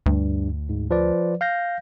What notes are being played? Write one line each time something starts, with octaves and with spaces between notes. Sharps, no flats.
D2 G2
G#2
F3 B4 D5
F5 G6 A#6